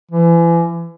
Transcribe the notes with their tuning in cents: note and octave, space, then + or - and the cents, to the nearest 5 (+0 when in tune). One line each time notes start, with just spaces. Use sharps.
E3 +35